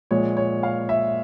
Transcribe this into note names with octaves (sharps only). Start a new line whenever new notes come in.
A#2 F3 G#3 C#5
C#5
F5
E5